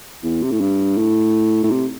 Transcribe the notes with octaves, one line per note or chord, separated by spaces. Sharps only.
E2
C3
A2
G2
A2
A2
C3